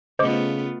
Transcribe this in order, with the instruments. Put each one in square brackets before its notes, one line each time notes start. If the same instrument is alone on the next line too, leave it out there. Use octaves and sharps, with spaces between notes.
[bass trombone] C#3 [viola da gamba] A3 B3 F4 [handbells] C5 D6 [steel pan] D#5